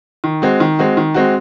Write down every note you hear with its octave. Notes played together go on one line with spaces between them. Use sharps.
D#3
G#3 C4 F#4
D#3
G#3 C4 F#4
D#3
G#3 C4 F#4